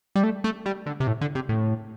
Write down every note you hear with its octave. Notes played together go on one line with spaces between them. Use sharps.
G3
A3
A3
G3
D3
C3
A2
D3
C3
A2